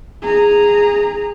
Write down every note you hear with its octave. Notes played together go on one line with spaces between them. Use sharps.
G#4 A#5